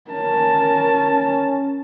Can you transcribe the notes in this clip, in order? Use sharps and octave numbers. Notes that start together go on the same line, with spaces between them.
C#4 A#4 A5